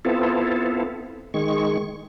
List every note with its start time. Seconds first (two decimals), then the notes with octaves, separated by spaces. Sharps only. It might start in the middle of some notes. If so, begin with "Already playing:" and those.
0.05 B3 C4 E4 F4 A4
1.34 D#3 G#3 C#6